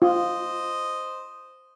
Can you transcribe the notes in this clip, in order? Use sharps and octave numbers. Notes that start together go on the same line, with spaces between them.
F4 C5 D#5